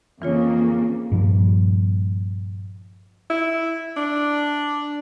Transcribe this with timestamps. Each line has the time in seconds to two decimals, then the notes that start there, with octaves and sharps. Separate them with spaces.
0.22 F2 C#3 E3 A#3 F4 C#5
1.12 G2 A#2 F3 G3
3.30 E4
3.97 D4